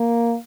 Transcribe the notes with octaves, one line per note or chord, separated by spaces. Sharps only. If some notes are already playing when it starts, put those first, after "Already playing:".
Already playing: A#3